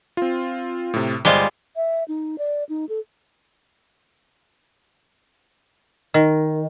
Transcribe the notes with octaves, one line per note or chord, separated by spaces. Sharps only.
C4 F4
A2 C3
G1 G3 G#3 F4 C5 D6
E5
D#4
D5
D#4
A4
D#3